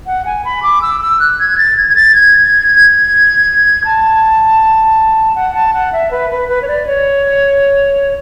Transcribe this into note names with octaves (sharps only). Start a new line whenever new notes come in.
F#5
G#5
B5
D6
E6
E6
F#6
G#6
A6
G#6
G#6
A6
G#6
A5
F#5
A5
F#5
E5
B4
B4
B4
C#5
D5
C#5